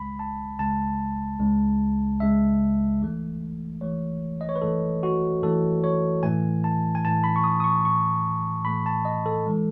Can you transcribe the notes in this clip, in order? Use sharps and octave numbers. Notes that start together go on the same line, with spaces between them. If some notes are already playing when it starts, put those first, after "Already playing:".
Already playing: C#2 C#3 G#3 B5
A5
C#2 C#3 G#3 A5
C#2 C#3 G#3
C#2 C#3 G#3 E5
F#2 E3 A3
F#2 E3 A3 C#5
D#5
C#5
B4
F#2 E3 A3 A4
F#4
F#2 E3 A3 A4
C#5
A2 E3 A3 G#5
A5
G#5
A2 E3 A3 A5
B5
C#6
D#6
D#6
C#6
A2 E3 A3 C#6
A2 E3 A3 B5
A5
D#5
A4
E3 G#3